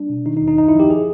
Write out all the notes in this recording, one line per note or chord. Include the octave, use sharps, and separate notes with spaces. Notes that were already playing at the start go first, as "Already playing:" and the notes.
Already playing: G3 D4
B2
D#3 D#4
D#4
D#2
D#4
F#2 D#4
E4
F3 G4
G#4